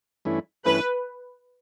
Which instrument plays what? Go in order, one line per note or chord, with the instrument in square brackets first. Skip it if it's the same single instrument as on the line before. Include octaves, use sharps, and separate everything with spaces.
[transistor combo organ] G2 E3 A3 C#4 E4
[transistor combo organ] G2 E3 A3 C#4 E4 [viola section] B4